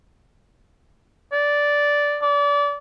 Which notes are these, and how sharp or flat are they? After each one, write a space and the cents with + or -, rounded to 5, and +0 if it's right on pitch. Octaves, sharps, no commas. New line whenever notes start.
D5 -10
D5 -30